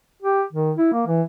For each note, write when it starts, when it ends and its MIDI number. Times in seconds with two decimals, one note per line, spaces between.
0.23 0.43 67
0.53 0.73 51
0.77 0.88 64
0.93 1.06 58
1.07 1.22 52